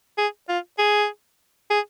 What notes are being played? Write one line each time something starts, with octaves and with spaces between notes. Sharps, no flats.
G#4
F4
G#4
G#4